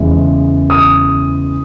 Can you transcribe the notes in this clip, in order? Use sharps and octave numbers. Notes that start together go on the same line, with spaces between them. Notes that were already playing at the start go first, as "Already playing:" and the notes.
Already playing: E2 C#3 E3 G#3
D#6